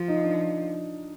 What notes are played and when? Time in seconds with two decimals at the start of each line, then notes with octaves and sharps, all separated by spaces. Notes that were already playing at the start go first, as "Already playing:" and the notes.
Already playing: F3 F4
0.08 D#4
0.24 D4